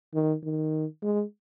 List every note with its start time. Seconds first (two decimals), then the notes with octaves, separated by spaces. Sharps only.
0.14 D#3
0.44 D#3
1.02 G#3